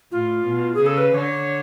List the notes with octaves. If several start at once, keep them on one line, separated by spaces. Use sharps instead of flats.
A2 F4
B2
G#4
C#3
A4
B4
D3 C#5